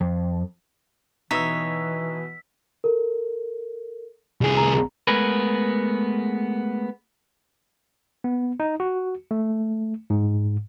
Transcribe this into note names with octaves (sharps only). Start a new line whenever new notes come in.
F2
B2 E3 D#4 B4 C#5 E5 E6 B6
A4 A#4
C2 G#4
A#5
G#3 A3 B3 G#4 A#4 B4
B3
D#4
F#4
A3
G#2